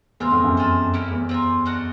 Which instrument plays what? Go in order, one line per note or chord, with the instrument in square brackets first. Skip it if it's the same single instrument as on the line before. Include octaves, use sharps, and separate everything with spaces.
[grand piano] E2 [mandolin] C4 F4 A#4
[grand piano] F2
F#2
[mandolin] F4 A4 C5
A#3 C#4 E4 G4
[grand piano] E2
[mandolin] C4 F4 A#4
D4 F#4 A#4 D#5